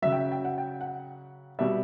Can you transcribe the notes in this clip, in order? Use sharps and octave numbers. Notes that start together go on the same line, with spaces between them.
C#3 F#3 E5
G5
G5
F#5
G5
F#5
B2 G3 E5